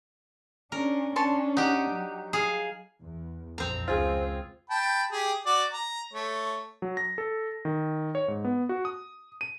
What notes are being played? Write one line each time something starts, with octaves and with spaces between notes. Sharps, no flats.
C#4 D4 A#4
C#4 D4 C#5 A5 C6
D#4 G4 F#5
F#3
G#4 F5
E2
A#1 F2 C4 A#5
C#2 F4 G#4 C5
G5 A5 B5
G4 G#4
F#4 D5
A#5
A3 C#5
F#3
A#6
A4
D#3
C#5
G#2
B3
F#4
D#6
D#7